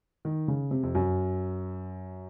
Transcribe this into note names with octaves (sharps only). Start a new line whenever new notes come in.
D#3
C#3
C3
F2
F#2